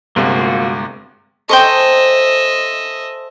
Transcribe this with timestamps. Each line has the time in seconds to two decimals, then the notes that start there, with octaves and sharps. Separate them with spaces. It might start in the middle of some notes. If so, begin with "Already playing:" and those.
0.16 G1 C3 G#3 A#3 F4 F#4
1.49 A4 C5 D#5 E5 G5 G#5 C6 C#6